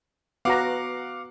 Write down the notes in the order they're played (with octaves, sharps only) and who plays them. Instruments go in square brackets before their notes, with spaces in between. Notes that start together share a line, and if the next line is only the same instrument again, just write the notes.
[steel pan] B3 F#4 A#5 [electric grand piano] F5 F#5 D6